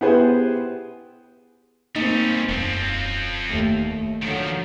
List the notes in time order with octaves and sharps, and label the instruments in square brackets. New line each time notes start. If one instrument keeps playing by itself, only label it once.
[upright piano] B3 E4 G4 G#4 B4 C5
[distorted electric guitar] G3 C#4 [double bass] A#3 C4 [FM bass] D#4
[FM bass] E1 [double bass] F#2 [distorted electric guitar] F3 C4
[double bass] D#2 A3
[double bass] D3 F#3 [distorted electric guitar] D#3 F3